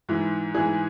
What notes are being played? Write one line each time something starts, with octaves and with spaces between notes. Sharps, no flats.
G#2 E3
G#2 E3 G#4